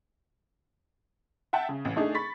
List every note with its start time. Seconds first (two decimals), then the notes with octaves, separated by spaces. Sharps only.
1.53 E5 F#5 G5 A5
1.69 C#3
1.85 A1
1.96 A3 D4 D#4 G#4
2.15 B5 C#6 A6 B6